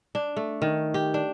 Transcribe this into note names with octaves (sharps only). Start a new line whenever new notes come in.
D4
A3
D#3
G4
D4